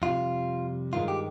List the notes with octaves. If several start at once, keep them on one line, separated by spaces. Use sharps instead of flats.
F2 C3 G3 F4
G2 D#3 G#3 F4
G4